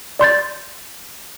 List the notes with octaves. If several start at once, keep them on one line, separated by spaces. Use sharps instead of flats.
D5 C6 G6 A6